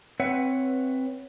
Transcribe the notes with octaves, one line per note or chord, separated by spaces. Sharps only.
C4 B4 C#5 E5 F#5